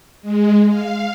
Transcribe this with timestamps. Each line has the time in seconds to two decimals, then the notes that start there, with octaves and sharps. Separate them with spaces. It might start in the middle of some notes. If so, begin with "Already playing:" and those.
0.22 G#3
0.69 F5